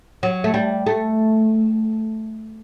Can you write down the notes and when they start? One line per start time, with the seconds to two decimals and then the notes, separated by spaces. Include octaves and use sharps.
0.23 F#3
0.44 A3
0.54 G3
0.87 A3